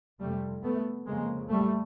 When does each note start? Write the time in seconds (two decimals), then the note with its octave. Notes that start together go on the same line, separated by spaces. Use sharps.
0.20 F2 C3 G3 A3
0.64 A3 B3
1.07 F2 C#3 G#3 A#3
1.50 G3 A3